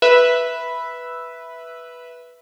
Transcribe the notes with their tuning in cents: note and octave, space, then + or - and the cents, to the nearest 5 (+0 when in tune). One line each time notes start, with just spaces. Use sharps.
B4 +0 E5 +0